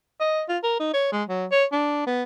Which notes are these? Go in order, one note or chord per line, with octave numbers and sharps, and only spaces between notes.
D#5
F4
A#4
D#4
C#5
G#3
F#3
C#5
D4
B3